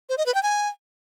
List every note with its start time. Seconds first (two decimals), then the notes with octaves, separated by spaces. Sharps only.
0.09 C5
0.18 D#5
0.26 B4
0.34 G5
0.43 G#5